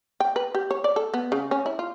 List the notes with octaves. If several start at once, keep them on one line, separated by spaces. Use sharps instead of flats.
G5
B4
G4
C#5
D5
A4
B3
C#3
C#4
E4
F4